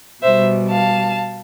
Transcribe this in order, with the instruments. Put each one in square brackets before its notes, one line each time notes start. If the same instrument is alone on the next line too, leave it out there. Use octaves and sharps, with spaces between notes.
[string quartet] B2 G3 C5 E5
F5 A5